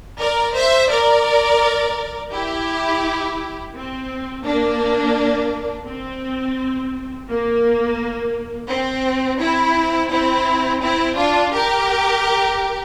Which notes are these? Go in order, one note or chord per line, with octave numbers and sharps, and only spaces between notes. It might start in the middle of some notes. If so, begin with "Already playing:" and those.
A#4 D5
C5 E5
A#4 D5
E4 G4
C4
A#3 D4
C4
A#3
C4
C4 E4
C4 E4
C4 E4
D4 F4
G4 A#4